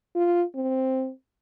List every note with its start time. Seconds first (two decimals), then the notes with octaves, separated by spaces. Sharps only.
0.15 F4
0.55 C4